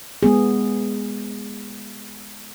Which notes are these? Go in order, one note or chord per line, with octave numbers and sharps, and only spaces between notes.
G#3 B3 G#4